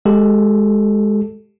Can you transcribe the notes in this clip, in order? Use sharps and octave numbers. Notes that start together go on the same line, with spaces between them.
G#3 G4 A4